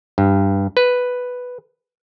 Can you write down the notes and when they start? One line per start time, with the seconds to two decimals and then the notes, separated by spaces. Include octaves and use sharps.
0.18 G2
0.77 B4